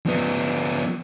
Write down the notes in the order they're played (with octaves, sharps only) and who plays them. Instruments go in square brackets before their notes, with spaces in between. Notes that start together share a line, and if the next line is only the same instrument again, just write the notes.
[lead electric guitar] F3 B3